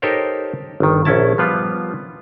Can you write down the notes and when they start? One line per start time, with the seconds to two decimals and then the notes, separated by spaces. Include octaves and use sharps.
0.02 D#4 G4 A4 A#4 C5 C#5
0.80 G1 D#3
1.05 A#1 C#4 E4 A5
1.38 F3 G3 B3 F4